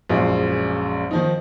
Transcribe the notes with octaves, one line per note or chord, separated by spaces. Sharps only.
A#1 F#2 G#3 F4 D5
D#3 F3 D#4